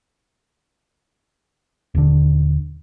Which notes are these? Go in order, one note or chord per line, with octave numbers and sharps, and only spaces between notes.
D#1 D3